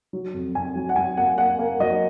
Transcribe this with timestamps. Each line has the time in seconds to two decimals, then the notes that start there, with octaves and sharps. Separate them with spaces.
0.13 F#3
0.34 F2
0.55 F2 G#5
0.75 F#3
0.89 F#5
0.96 F#3 G#5
1.17 A#3 F#5
1.38 A#3 F#5
1.59 A#3
1.80 F#3 D#5